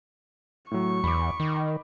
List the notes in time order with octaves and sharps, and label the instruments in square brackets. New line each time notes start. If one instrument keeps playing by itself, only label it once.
[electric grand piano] A2 F#3 [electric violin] C#6
[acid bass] E2 [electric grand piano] B5 D6
[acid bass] D#3